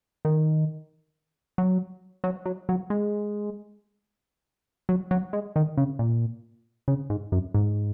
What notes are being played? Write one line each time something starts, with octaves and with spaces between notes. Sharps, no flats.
D#3
F#3
F#3
F#3
F#3
G#3
F#3
F#3
G#3
D#3
C#3
A#2
C#3
G#2
F#2
G#2